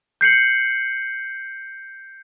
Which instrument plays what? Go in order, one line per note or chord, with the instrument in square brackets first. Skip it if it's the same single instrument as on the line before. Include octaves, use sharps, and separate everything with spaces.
[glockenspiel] G6 C7 C#7 F#7